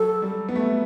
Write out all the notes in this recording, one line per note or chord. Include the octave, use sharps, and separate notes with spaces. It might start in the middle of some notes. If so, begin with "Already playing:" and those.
Already playing: F#3 A4
G3
B3
A3